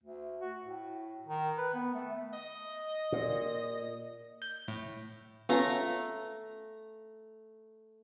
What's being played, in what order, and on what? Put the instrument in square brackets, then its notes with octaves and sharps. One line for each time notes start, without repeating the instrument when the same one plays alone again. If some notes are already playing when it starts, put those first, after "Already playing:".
[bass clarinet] D2
F#4
A2
D#3
B4
B3
A3
[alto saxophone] D#5
[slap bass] A#2
[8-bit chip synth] G6
A2
[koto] A3 A#5 [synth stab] B3 C#4 F4